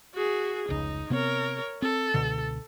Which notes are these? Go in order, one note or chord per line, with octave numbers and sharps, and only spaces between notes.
F#4 G#4
F1 C#2 D#4
C3 B3 C4 A#4 C#5
C4 A4
C#2 B2 D3